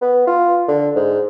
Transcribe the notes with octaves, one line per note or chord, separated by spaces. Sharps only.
B3
F4
D3
G#2